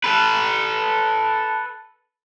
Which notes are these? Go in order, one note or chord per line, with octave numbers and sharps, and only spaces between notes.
A4 B4